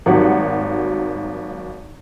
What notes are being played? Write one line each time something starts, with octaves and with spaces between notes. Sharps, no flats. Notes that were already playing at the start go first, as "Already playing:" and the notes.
G#1 D#2 F#3 G3 F#5